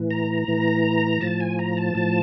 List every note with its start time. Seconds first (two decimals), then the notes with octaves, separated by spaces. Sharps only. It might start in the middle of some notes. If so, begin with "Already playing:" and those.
Already playing: A2 E3
0.11 A#5
0.48 A2 E3
1.21 A2 F3 A5
1.40 G#5
1.59 A#5
1.77 A5
1.95 A2 F3